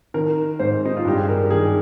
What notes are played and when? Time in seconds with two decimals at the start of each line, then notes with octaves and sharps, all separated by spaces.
0.14 D#3 A#4
0.59 G#2 C5
0.85 D#4
0.97 F4
1.05 G2 G4
1.17 G#4
1.29 A#4
1.50 D#3 G#4